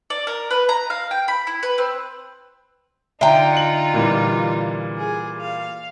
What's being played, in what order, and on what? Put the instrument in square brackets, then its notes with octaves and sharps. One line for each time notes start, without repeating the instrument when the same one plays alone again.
[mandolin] D5
A#4
B4
A#5
F5
G5
B5
E4
B4
C4
[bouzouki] D3 G5 [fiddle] D#4 F4 [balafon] E5 A#5
[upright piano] C#7 F#7
A#2 E3 G3
[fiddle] G#4
F5